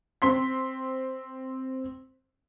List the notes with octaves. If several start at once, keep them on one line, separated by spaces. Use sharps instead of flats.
C4 C6 B6